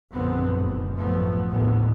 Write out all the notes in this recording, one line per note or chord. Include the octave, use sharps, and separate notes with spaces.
A#1 F#2 D3 B3 C4
F1 F#2
A1 F3 A3 B3
A1 D#2 G#2 D3 B3